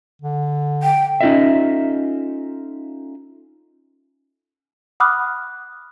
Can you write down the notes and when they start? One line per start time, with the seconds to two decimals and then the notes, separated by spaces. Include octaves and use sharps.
0.22 D3
0.83 G5
1.21 C#4 D#4 F4 A4 D#5 E5
5.00 F#5 B5 D6 D#6 F6 F#6